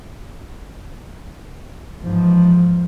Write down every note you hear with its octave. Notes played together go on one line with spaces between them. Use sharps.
E2 G#2 F3